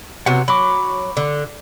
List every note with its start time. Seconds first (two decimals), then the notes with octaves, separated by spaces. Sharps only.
0.26 C3 F#3 B3 F#5
0.48 F#3 B5 D6
1.17 D3